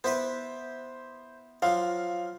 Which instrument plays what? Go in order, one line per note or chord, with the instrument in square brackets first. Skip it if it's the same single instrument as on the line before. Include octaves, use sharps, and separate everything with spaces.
[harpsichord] B3 E4 B4 [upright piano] C5
[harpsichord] F3 F#3 [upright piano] F5